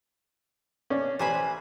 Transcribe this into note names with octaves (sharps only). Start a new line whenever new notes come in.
C#4 D4
A1 C5 G#5 B5